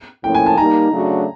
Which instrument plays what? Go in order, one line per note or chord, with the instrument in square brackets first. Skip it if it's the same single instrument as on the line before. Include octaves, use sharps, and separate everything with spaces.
[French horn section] A2 F3 A#3 C#4 E4 [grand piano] G5
[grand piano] G#5
A5
[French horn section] G3 A#3 D#4 [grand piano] A#5
[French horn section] C#3 F#3 A3 D4 F#4